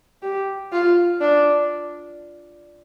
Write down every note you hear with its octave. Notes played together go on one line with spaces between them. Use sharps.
G4
F4
D4